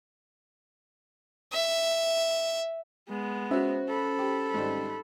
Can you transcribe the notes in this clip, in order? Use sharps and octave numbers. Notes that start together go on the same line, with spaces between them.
E5
G#3 B3
C#4 F#4 C5 E5
A4 B5
G4
G#1 G3